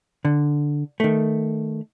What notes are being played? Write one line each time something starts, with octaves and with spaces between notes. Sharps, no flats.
D3
D#3 A3